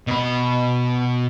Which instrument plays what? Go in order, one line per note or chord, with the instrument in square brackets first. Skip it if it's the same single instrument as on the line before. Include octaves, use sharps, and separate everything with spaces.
[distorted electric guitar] B2 B5